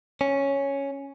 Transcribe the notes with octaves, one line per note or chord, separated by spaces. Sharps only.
C#4